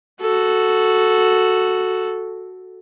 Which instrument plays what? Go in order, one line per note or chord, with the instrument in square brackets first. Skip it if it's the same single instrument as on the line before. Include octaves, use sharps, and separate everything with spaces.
[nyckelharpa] F#4 A4